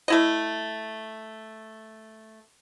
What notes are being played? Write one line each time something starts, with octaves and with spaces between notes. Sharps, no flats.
A3 E4 D#5